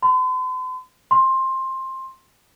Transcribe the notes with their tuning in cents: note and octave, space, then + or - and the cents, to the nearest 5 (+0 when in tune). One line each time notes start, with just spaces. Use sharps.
C6 -45
C6 +15